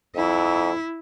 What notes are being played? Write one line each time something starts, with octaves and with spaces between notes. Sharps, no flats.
F2 E4